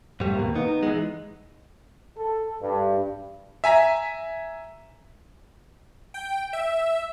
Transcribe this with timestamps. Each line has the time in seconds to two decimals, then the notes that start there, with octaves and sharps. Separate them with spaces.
0.20 G#2 G3 A3
0.35 D#2 B2 A#3
0.55 B3 D#4
0.83 E3 G#3
2.17 A4
2.61 G2
3.64 E5 G#5 A#5 B6
6.14 G5
6.53 E5